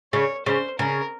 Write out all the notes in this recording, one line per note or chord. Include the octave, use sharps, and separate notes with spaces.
C#3 C#5
C#3 C5
C#3 A#4